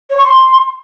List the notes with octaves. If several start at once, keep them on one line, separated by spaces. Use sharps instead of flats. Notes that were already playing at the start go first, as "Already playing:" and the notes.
C#5
C#6
C6